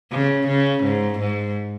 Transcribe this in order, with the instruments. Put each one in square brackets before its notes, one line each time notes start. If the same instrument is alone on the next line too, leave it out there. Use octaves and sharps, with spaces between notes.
[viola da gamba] C#3
C#3
G#2
G#2